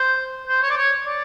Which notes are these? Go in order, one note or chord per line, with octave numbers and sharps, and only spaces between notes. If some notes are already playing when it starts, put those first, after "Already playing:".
Already playing: C5
C5
C#5
D5
C#5
D5